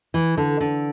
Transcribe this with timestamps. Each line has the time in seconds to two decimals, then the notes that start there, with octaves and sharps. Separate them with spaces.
0.14 E3
0.37 D3
0.60 D3